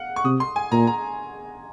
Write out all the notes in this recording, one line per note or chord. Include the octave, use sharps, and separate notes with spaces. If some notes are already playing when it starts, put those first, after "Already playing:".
Already playing: F5 F#5
C#6
C3 D#6
C6
G#5
A#2 A#5
A#5